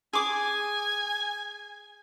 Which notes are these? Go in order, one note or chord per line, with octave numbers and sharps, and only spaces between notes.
G#4 G#5 D6